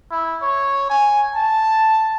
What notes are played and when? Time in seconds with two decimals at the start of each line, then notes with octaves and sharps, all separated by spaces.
0.11 E4
0.42 C#5
0.90 G#5
1.35 A5